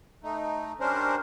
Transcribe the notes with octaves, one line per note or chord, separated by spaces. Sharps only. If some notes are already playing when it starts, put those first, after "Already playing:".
A3 D#4
G3 C#4 D4 A#4 C5